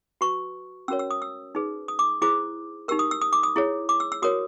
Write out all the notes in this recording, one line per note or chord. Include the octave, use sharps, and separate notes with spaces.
F#4 B4 C#6
C#4 F#4 A#4 C#5 E6
E6
D#6
E6
D#4 G#4 B4
D#6
D6
E4 G#4 C5 D6
D#4 G4 A#4 E6
D#6
E6
D#6
D6
D#6
E4 G#4 C#5
D6
E6
E6
F#4 A#4 C#5 D#6